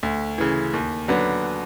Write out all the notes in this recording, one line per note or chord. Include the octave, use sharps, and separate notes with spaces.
D2
C#3 E3
D#2
D3 F#3 B3 D4